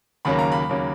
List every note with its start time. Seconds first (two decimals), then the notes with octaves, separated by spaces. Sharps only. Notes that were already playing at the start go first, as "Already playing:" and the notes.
0.25 D#2 C#3 F#3 A#3 B5
0.39 A#5
0.52 B5
0.69 D#2 C#3 F#3 A#3